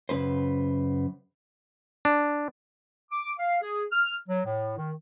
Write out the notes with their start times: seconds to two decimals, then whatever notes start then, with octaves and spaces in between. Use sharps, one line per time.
0.09 F#2 C#3 C#4 B4 C5
2.05 D4
3.11 D6
3.39 F5
3.62 G#4
3.92 F6
4.29 F#3
4.45 A2
4.77 D#3